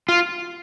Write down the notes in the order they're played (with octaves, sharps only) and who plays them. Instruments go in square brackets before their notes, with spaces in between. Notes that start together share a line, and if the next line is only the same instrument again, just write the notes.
[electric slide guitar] F4